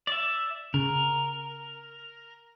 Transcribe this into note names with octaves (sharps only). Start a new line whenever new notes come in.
D5 E5
C#3 A#4